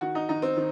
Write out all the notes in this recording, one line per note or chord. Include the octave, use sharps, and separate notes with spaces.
D#3 F#4
D#4
D#3 D#4
C4
D#3